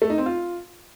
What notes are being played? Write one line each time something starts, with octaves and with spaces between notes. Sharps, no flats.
A3
D#4
C4
F4